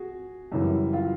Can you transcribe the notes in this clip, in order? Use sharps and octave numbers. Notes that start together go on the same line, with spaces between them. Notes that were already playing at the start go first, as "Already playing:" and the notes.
Already playing: F#4 G#4
F#2 C#3 E3 G3
F4